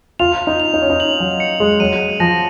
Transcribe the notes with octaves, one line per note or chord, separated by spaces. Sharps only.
F4 F7
D#4
F7
D#4
C#4
D#4
F#7
F#3
C#7
G#3
F#3 D#7
F3 A#6